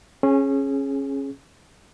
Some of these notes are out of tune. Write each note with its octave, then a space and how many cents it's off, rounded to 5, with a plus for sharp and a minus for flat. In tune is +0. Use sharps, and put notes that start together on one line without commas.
C#4 -20 G#4 +10